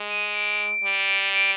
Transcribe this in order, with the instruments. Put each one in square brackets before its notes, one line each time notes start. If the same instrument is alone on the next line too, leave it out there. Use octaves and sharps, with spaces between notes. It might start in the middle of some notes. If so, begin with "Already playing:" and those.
Already playing: [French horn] G#3
[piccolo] D#7
D7
[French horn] G3
[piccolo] D7